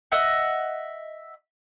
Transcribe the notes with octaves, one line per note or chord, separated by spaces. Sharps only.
D#5 E5 F#5